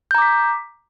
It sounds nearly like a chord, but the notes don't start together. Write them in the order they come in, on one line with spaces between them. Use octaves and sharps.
G6 A#5 D6 B6